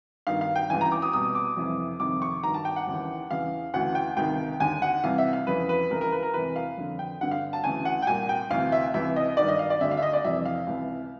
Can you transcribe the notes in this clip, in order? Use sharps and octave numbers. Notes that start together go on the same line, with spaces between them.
G2 D#3 F5
F5
G5
C#2 C#3 E3 G#5
A#5
D6
D#6
C2 B2 D#6
D6
F2 C3 E3
F2 C3 D#3 D6
C#6
G2 D#3 A#5
A5
G5
F#5
D#2 C#3 E3
E2 C#3 E3 F5
D2 C#3 E3 F#5
G5
C#2 C3 D#3 G5
D#2 D3 G#5
F#5
C2 C3 E3 F5
E5
F5
F2 C#3 E3 B4
B4
C#2 C#3 E3 A#4
A#4
B4
A#4
E2 C3 E3 B4
F5
F2 D3
G5
G2 D3 F#5
F5
A5
D2 C#3 E3 G#5
F#5
G5
C2 A#2 G#5
G5
D2 C3 E3 F5
E5
C#2 C3 E3 E5
D#5
G2 D#3 D5
D#5
F5
D5
D2 D3 E5
F5
E5
D#5
D5
F2 C3 E3 E5
F5
C#2 C3 E3